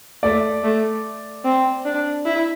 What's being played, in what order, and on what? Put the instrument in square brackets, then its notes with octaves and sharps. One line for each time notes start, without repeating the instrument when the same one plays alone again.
[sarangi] A3 [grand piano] D5
[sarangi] A3
C4
D4
E4